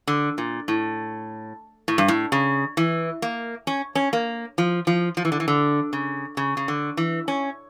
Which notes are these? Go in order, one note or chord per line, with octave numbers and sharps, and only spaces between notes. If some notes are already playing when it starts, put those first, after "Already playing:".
D3
A#2
A2
A2
G2
A2
C#3
E3
A#3
C#4
C#4
A#3
F3
F3
F3
E3
D3
E3
D3
C#3
C#3
C#3
D3
E3
C#4